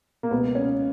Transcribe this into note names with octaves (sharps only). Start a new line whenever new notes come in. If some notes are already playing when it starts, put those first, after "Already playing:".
A#3
C#2 B2 B3
C#4